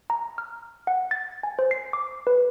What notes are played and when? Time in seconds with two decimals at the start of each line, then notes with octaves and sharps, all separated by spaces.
0.10 A#5
0.38 F6
0.87 F#5
1.11 A6
1.43 G#5
1.59 C5
1.71 C7
1.93 D6
2.27 B4